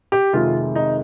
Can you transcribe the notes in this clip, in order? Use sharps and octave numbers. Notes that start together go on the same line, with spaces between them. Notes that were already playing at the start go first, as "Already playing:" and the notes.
G4
F2 C3 D#3 G#3 F4
D#4